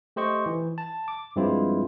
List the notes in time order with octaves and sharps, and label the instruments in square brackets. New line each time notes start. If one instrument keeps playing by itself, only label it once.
[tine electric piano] A3 G4 C5 D#5 C#6
E3
A5
D6
G2 F3 G#3 C4 E4 F4